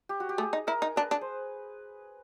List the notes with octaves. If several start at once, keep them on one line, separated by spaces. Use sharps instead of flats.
G4
F#4
G4
A3 G#4
D#4
E4 A#4
D#4
D4 B4
D4
C5